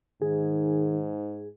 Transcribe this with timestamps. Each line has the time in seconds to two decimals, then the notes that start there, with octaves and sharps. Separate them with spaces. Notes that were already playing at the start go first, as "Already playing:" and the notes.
0.22 G#2 D#3 G#4